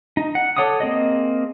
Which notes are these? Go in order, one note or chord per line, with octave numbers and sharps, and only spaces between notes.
D#4
F#5
A4 C#5 F#5 D6 D#6
A#3 C4 G#4 D#5